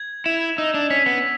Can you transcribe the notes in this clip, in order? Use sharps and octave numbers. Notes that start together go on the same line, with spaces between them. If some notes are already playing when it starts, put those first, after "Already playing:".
Already playing: G#6
E4 F7
D#4 E6
D4
C#4 B6
B3